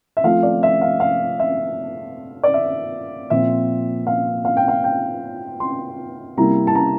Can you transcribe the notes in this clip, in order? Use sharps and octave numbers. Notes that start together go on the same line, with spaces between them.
E5
F3 A3 C4 F5
D5
E5
F5
F5
E5
D5
E5
A#2 F3 C4 E5
F5
F5
G5
F5
G5
C6
C3 G3 A#3 E4 A#5
A5
A#5